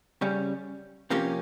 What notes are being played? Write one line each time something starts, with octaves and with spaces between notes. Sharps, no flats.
C#3 G3 C#4
C3 F3 A#3 C#4 G4